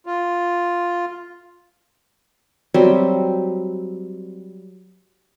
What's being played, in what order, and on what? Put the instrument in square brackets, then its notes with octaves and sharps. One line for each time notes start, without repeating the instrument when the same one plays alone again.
[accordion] F4
[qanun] F#3 G3 C4 E5